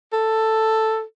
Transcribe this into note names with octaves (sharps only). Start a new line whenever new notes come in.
A4